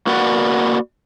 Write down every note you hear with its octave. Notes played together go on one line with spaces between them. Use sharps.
A#3 F#4 A#4 B4 D5 F#5